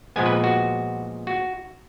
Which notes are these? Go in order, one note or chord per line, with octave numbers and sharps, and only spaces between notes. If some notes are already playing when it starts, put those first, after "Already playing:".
A#2 F3 G#3 B3 G#5
B4
F#4
F#4